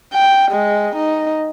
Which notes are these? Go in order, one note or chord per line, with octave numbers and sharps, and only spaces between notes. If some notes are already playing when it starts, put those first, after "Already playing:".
G5
G#3
D#4